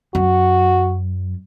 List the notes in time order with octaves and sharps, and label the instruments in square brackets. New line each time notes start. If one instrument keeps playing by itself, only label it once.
[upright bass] F#2 [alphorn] F#4